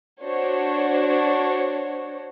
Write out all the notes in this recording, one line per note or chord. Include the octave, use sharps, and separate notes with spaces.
D4 F#4 C5 C#5